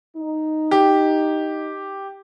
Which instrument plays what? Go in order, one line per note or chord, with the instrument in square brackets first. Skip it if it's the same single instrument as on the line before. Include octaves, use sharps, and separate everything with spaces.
[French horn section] D#4
[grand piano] G4